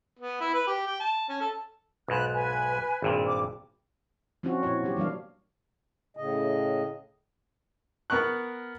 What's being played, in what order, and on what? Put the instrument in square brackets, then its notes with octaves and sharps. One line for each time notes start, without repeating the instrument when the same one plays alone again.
[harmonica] B3
E4
B4
G4
G5
A5
C#4
A4
[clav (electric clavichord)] B1 G#2 [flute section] B5 F#6
[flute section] B4 G#5
[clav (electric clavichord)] G#1 G2 A#2
[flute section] D6
[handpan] F3 C4 C#4 D#4 F4 F#4
A#2 C#4 E4 C#5
C3 F#3 D4 G4
E3 G3 A#3 D4 F5
[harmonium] A2 C#3 D#5
[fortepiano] B3 A#4 C#6 F#6